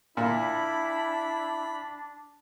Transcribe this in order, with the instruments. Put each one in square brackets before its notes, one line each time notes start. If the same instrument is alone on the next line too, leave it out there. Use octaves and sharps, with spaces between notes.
[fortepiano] A#2 [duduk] D4 [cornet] E4 [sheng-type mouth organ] B5